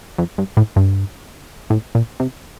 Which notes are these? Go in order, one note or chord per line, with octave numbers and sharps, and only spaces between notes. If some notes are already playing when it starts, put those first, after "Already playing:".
F2
G2
A2
G2
A2
A#2
C3